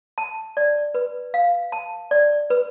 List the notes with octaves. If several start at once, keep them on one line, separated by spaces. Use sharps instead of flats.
A5
D5
B4
F5
A5
D5
B4